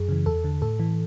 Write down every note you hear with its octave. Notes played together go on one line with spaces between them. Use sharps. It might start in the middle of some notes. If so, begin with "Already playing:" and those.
Already playing: F#2 G#4
C#3 E3
E2 A4
D3
A2 A4
E3